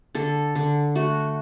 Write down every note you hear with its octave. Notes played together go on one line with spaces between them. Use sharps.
D3 A4
D3
A3 F#4